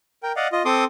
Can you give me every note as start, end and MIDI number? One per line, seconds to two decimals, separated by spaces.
0.23 0.32 70
0.23 0.32 79
0.36 0.47 74
0.36 0.47 75
0.36 0.47 77
0.36 0.47 78
0.52 0.63 65
0.52 0.63 75
0.65 0.84 60
0.65 0.84 69
0.65 0.84 84
0.65 0.84 86
0.65 0.84 87